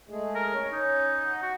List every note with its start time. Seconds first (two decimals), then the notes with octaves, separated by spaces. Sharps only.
0.09 G#3 A3 G#4
0.35 A#4
0.54 C#4 C#5
0.73 D#4
1.25 F#5
1.43 F#4